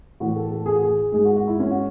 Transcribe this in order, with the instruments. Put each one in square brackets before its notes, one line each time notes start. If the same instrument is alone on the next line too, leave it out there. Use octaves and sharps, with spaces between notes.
[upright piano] A2 E3 A3 F#4
A4
A4
G#4
F#4
G#4
G#2 G#3 G#4
F#4
F#4
E4
C#4
F#4